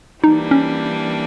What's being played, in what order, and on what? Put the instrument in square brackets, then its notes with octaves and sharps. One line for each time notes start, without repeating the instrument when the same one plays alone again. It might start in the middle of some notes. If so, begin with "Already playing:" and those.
[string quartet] E3 G3 A#3 D4 [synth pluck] D#4
[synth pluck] C#4